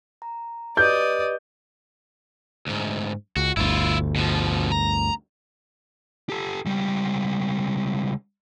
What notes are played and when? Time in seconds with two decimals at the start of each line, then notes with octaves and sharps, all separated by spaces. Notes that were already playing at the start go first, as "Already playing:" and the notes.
0.22 A#5
0.77 G4 B4 D5 D#5 D#6 G6
2.67 D2 G#2
3.37 C#2 F#4
3.57 G1 D2 E4 F4
4.16 B2 F3
4.72 A#5
6.30 G4 A4
6.66 C#2 G3